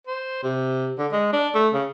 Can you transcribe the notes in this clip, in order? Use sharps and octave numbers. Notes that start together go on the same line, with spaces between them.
C5
C3
D3
G#3
D4
A3
C#3